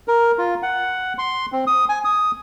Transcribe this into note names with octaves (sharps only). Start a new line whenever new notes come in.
A#4
F4
F#5
C6
C4
D#6
G#5
D#6